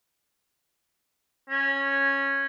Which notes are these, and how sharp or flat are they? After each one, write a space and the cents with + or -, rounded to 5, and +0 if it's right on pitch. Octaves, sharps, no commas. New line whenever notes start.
C#4 -10